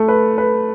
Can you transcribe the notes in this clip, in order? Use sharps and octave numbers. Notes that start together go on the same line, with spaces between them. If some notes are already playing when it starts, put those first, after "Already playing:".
Already playing: A3
B4
B4